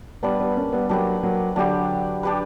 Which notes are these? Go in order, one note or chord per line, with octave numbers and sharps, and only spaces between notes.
G3 B3 D4 G4 B4
G3 B3
A#3 C#4
G3 B3
F#3 A#3 D4 G4 B4
F#3 A#3
D3 F#3 D4 G4 B4
D4 G4 B4